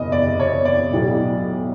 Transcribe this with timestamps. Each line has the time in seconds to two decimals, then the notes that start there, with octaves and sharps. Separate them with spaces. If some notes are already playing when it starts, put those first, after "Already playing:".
Already playing: F#1 E2 B2 D#5
0.12 D5
0.40 C#5
0.65 D5
0.93 B1 A2 F#3